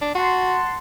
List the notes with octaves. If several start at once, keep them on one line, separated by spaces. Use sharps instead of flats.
D4
F#4 F#5 A5 C6